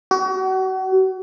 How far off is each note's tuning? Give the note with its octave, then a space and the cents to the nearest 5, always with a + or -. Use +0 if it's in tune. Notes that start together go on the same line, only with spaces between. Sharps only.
F#4 +35